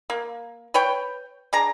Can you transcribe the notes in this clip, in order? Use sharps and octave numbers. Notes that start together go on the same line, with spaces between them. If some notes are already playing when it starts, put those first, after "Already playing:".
A#3
B4 C#5 G5
D4 G#4 A#5